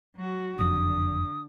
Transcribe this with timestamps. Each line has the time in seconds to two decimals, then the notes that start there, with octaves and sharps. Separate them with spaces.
0.16 F#3 F#4
0.59 F#1 F2 D3 D#6